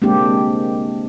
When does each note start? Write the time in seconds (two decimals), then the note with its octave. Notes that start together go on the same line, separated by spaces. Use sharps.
0.02 G#3 A#3 C4 D4 G4